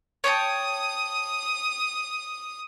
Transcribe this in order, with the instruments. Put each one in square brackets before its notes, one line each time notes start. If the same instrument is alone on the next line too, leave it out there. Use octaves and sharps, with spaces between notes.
[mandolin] C#5 G5 A5 [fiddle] D#6